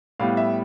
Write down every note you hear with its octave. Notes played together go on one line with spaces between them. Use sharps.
A2 G3 B3 F5
E5